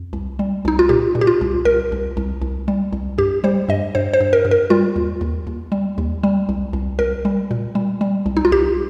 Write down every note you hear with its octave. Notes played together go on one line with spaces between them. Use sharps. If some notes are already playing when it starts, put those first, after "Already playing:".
Already playing: F2
C2
G3
C2 D#4
F4
A#2 G4
A#2
G4
F4
C2
C2 A#4
C2
C2
C2
G3
C2
G2 G4
G3 C5
G2 D#5
G2 C5
C5
G2
A#4
G2
A#4
G3 F4
D#2
D#2
D#2
G3
D#2
G3
C2
C2
C2 A#4
G3
A#2
G3
G3
C2
D#4
F4
C2 G4